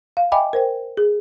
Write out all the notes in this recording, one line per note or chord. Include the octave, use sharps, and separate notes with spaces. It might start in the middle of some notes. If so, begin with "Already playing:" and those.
F5
D#5 E5 G5 G#5 B5 D6
A#4 C5 G5
G#4